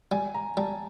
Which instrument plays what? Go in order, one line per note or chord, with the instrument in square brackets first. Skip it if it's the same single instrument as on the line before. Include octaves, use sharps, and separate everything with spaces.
[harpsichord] G3 [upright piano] G#5
[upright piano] A#5
[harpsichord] G3 [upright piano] A5